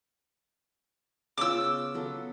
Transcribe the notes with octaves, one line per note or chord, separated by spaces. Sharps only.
C#3 B3 F4 D6 E6
F#3 B3 A4